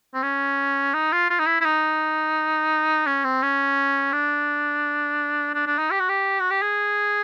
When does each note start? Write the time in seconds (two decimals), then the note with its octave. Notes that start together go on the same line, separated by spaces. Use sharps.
0.14 C4
0.23 C#4
0.94 D#4
1.12 F4
1.30 F4
1.39 D#4
1.47 E4
1.61 E4
1.65 D#4
3.06 C#4
3.24 C4
3.42 C#4
4.12 D4
5.54 D4
5.66 D4
5.78 D#4
5.91 G4
6.00 F#4
6.09 G4
6.40 F#4
6.51 G4
6.62 G#4